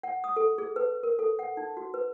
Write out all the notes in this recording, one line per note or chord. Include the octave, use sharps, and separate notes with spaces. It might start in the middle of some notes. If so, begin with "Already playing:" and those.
F#5
D#6
A4
G#4
B4
A#4
A4
F#5
D#4
F#4
B4